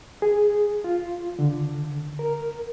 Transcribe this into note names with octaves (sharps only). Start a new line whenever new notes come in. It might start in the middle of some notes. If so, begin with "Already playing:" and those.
G#4
F4
D3
A#4